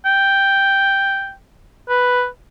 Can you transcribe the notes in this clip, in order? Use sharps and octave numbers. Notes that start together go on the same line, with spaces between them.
G5
B4